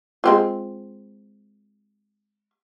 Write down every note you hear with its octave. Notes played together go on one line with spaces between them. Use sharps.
G#3 C4 F4